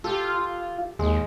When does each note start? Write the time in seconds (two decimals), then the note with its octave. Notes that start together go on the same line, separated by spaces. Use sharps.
0.04 F4 G4 A4
0.99 D#2 G#3